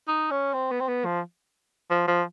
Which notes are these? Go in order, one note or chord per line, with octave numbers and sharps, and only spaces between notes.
D#4
C#4
C4
B3
C4
B3
F3
F3
F3